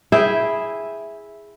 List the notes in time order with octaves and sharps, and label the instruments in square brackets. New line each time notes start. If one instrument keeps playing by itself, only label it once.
[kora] E4 G#4 E5 G5